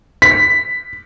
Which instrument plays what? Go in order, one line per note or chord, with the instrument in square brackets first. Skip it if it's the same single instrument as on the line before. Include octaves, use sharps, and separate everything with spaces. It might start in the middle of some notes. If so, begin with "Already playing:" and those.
[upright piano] B6